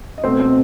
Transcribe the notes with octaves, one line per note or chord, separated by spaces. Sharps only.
D#5
B2 A3 C4 C5
C4 C5